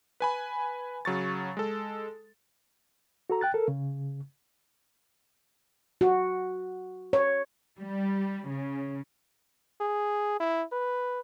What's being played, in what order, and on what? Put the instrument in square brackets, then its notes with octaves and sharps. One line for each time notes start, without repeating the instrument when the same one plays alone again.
[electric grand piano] B4 G#5 B5
C#3 F#3 C#6 A6
G#3 A4
[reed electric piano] F#4 A4 A#5
G5 F#6 A6
A4 A#4
C#3
[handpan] F#4
C#5
[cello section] G3
C#3
[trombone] G#4
E4
B4